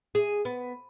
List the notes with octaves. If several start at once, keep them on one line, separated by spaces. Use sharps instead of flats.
G#4
B3